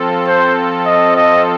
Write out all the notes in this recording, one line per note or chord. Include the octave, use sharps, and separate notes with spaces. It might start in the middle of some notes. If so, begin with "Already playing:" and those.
Already playing: F3 C4 F4 A4
C5
D#5
D#5